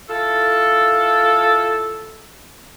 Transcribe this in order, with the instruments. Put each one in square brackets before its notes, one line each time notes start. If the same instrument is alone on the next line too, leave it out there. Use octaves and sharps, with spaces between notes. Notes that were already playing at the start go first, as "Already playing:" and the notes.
[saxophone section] E4 F4 A4